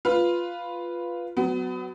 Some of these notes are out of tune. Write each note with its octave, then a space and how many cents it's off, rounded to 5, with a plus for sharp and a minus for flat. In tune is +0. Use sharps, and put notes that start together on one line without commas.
F4 +0 B4 +0
F#3 +0 B3 +30